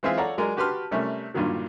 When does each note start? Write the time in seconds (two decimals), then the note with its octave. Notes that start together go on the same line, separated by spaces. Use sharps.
0.03 E3 G#3 C4 F4 G#4 E5
0.17 A4 C#5 D5 F5 F#5 A#5
0.38 F#3 G#3 A#4 D5
0.57 F#4 G4 B4 A5 C6 F6
0.91 C3 G3 A3 C#4 A#4
1.34 G2 A#2 D3 D#3 F#3